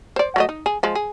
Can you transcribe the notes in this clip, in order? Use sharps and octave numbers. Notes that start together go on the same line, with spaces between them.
C5 D5
F#3 A3 D#5
D#4
G#4
F3 G#3
G#4